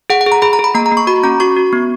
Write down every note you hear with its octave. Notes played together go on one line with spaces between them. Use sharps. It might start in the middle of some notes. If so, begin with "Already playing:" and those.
G#4 F#5
F#5
G#4
A#5
G#4 B5
A#5
G#4
B5
A#3 A#5
A#5
A#3
C#6
F#4 B5
C#4 A#5
F#4 C#6
F#4
B3